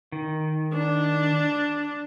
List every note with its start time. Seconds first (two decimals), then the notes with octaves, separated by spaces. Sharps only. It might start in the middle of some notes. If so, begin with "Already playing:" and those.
0.12 D#3
0.74 D4